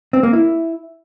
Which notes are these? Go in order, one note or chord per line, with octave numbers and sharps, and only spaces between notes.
C4
A#3
E4